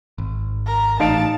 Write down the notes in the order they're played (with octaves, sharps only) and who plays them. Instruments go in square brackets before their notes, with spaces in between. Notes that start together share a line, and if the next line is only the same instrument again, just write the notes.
[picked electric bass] G#1
[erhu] A#4
[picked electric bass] A1 [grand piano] D#4 F5 D7 [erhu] A5